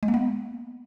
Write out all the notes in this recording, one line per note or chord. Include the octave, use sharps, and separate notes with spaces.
G#3
A#3
B3